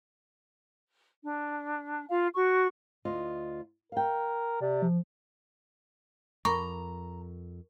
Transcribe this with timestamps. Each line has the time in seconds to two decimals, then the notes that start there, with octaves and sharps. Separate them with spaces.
1.23 D4
2.09 F4 F5
2.34 F#4 C#6
3.05 D2 F4 D#5
3.92 A#4 F5 G5
4.61 C3 D5
4.82 F3
6.45 F2 A#4 A#5 B5 C#6 D6